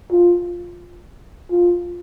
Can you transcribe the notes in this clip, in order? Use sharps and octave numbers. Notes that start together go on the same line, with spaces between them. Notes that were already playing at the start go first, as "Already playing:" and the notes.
F4
F4